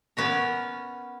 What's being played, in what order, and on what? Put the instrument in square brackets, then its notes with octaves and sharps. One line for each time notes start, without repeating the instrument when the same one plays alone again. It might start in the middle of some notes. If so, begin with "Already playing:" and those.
[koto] B3 C#4 A#4